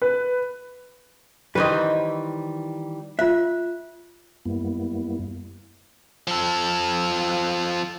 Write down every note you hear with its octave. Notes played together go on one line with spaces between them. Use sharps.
B4
D#3 E3 G3 B4 C5 D#5
F4 E5 F#6
F#2 G3 A#3 B3 E4
F3 A4